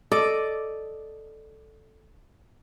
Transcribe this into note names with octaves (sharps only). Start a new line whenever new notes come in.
A4 D5 D#5 D6